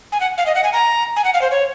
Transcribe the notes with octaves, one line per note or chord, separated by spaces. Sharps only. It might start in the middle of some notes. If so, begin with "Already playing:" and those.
G#5
F#5
F5
D#5
F#5
G#5
A#5
G#5
F#5
F5
C5
C#5